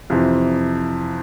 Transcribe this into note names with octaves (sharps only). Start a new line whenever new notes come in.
F2 C3 E3